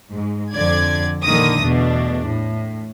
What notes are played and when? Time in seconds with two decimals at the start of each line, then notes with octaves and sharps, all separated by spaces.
0.11 G#2
0.52 F2 D3 D5 G#6
1.23 A#1 D3 D#3 A#3 D#6 A#6
1.60 E2 B2 A3 D4
2.25 A2